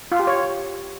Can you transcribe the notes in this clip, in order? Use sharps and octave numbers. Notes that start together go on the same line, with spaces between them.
F4
G4
C#5